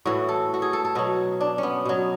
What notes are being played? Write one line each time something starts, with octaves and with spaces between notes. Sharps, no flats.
A2 E3 F#4
A4
F#4
G#4
A4
A4
B2 F#3 F#4
D4
C#4
B3
B2 F#3